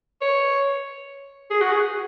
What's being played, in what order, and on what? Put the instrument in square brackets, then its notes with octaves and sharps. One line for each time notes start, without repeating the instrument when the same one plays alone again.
[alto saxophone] C#5
G#4
F#4
G#4